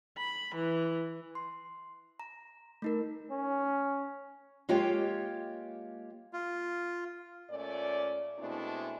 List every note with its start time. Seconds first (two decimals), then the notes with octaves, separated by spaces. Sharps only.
0.18 B5
0.55 E3
1.35 C6
2.20 A#5
2.82 A3 D#4 A#4
3.31 C#4
4.69 G#3 A#3 F4 G4 C#5 G5
6.33 F4
7.51 A#2 A3 C#4 D5
8.39 B2 G#3 A3 C4 D4 E4